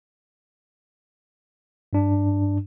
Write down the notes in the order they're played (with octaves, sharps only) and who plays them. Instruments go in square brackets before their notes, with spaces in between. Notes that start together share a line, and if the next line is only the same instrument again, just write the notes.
[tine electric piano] G2 D4